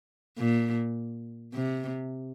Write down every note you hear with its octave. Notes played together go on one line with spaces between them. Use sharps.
A#2
C3